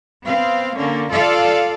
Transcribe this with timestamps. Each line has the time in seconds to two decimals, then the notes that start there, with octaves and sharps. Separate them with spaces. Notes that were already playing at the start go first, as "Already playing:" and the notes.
0.23 B3 C4 F5
0.76 D3 A#3 C#4
1.12 F4 A4 D5 F5